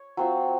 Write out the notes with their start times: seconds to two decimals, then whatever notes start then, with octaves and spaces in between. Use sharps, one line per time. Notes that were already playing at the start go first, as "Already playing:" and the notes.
Already playing: C#5
0.17 F#3 C4 F4